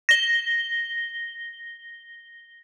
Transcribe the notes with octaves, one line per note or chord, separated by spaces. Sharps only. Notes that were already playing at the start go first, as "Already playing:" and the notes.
A#6 G7